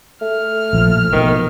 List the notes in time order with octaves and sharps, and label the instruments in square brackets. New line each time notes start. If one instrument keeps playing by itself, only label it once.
[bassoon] A3 [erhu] F6
[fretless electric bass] A#1 F3
[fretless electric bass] B2 F3 [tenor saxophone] D#3